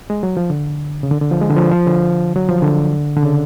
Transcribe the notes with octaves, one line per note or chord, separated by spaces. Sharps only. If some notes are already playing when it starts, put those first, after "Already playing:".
G#3
F#3
F3
D3
C#3
D3
D3
F3
G#3
D3
F3
F3
D3
F#3
F3
D3
D3
C#3